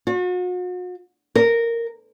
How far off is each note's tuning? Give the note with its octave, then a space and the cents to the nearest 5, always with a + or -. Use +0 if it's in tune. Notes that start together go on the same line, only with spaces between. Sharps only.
F#4 -40
A#4 -10